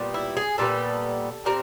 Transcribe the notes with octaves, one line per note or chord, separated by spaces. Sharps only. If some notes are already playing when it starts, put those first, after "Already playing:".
Already playing: A#2 G3 B3
E4
G#4
A#2 G3 B3 A4
A#2 G3 C4 A#4